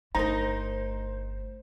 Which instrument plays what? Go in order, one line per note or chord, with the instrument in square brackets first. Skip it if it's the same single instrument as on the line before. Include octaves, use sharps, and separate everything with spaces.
[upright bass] G1 A3 [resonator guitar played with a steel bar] D#4 A#4 [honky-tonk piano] C5 [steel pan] A#5